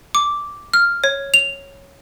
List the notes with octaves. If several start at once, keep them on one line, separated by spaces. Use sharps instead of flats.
D6
F6
C#5
F7